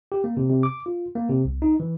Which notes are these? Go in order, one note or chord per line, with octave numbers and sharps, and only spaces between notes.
G4
A#3
C3
C3
D6
F4
A#3
C3
C2
D#4
E3